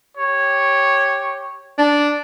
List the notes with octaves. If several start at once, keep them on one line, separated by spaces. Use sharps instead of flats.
G4 C#5
D4